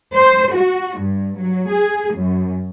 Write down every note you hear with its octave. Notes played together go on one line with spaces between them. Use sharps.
C5
F#4
G2
F#3
G#4
F#2